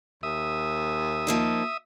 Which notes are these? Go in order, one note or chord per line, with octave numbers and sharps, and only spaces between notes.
D#2 E5 D#6
F3 A#3 D#4